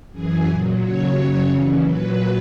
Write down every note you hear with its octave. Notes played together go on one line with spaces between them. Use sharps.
F#2 E3 G#4
A#2 F#3
D#2 C#3 F#3 C#5
F#2 C#3 F#3 C#5
D#2 C#3 E3
A#2 F#3 B4